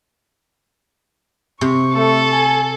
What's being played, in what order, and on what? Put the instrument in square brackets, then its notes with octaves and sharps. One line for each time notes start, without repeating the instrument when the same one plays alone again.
[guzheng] C3 [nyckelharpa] C#6
[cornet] A3 [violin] A4
[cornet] G#5